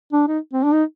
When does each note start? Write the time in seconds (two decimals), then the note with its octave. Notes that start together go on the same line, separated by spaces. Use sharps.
0.13 D4
0.28 D#4
0.53 C4
0.64 D4
0.73 D#4